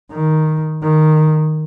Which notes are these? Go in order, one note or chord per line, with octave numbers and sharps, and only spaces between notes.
D#3
D#3